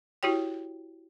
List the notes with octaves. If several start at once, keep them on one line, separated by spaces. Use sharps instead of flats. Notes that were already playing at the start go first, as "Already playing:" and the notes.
E4 F#4 G4 C#5 G5